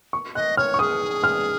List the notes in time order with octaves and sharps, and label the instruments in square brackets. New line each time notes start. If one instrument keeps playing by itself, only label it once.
[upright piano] C#6
[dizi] D#5 [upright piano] F#6
[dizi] C#5 [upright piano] F6
[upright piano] C#6
[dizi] G#4 [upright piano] D#6
[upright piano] F6